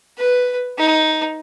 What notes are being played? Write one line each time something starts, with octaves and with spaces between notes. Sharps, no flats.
B4
D#4